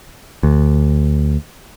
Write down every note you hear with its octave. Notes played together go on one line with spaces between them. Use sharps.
D2